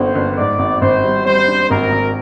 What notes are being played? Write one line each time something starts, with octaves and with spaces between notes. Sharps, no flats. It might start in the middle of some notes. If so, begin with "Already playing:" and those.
Already playing: G1 D3 C5
G1
G#2 D5
G#1
G#1 C5
G3
G3 C5
D4
G#1 A#4
G#1